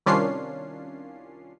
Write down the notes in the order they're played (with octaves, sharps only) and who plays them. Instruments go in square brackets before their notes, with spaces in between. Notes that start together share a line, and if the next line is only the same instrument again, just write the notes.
[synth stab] C2 D#3 C#4 D4 F4 C7